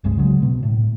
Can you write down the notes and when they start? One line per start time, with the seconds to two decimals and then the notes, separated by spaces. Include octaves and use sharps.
0.04 D1 C2 G2 G#3
0.17 C#3 F#3 G#3
0.42 B2
0.63 A2